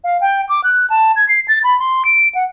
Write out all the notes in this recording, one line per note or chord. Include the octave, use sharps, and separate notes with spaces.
F5
G5
D6
F#6
A5
G#6
C7
A6
B5
C6
D7
F#5